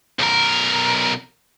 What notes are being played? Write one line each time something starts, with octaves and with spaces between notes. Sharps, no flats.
B1 A#4